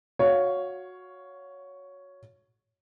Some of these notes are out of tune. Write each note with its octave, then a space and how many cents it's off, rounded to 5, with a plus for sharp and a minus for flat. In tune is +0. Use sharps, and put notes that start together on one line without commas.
F#4 -15 C#5 +5 F5 +0